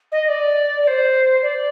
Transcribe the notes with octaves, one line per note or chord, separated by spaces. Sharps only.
D#5
D#5
D5
D5
C5
D5